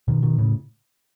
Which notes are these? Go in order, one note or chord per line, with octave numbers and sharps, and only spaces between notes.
B2 D#3
B2 D#3
A2 C#3